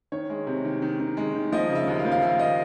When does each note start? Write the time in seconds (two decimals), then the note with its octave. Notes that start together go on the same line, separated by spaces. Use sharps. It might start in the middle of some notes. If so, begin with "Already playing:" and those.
0.12 D#3 C#5
0.30 G#3
0.47 C3
0.65 D#3
0.82 D#3
1.00 D#3
1.17 G#3
1.35 D#3
1.52 F3 D#5
1.69 C#3
1.75 E5
1.88 D#2
1.99 F5
2.05 F3
2.12 F5
2.22 D#2 E5
2.39 D#5